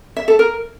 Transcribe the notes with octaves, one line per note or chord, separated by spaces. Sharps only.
E5
A4
A#4